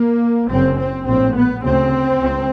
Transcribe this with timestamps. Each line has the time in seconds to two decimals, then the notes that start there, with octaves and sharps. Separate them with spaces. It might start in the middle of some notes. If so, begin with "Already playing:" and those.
Already playing: A#3
0.49 F#1 F#2 C#3 C4
0.77 C4
1.06 A#1 A2 C4
1.35 B3
1.63 D2 C#3 C4
2.21 C#2